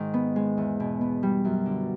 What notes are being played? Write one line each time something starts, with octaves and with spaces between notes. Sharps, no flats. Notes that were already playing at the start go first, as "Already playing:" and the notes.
Already playing: G#2 D#3
B3
G#3
E2
B2
B3
G3
F#2
D3